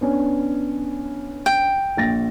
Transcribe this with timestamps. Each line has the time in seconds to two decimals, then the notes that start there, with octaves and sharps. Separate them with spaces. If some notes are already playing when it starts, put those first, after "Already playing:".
0.01 B3 C#4 D4
1.46 G5
1.97 A#1 A6 A#6